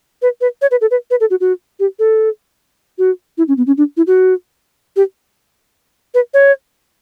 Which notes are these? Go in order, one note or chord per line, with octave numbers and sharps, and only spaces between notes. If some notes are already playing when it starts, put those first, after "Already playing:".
B4
B4
C#5
B4
A4
B4
B4
A4
F#4
F#4
G4
A4
F#4
E4
C#4
B3
C#4
D4
E4
F#4
G4
B4
C#5